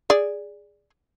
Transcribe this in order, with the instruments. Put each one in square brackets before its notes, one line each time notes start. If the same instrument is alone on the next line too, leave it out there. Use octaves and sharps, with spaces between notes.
[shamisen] G#4 D5